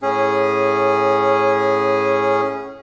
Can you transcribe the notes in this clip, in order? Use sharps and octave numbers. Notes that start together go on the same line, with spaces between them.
A2 C#4 G#4